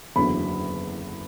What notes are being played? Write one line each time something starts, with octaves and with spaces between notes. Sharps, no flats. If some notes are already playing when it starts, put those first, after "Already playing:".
F#1 E2 D3 F#3 B5